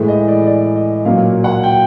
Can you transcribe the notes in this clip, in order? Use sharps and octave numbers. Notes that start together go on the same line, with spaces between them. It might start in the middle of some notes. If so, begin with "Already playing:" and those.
Already playing: A2 E3 G#3
D#5
D5
D5
D#5
A#2 F#3 A#3 F5
F#5
G5